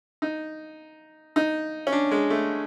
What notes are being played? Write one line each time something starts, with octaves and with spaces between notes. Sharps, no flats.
D#4
D#4
C#4
D4
G#3
A3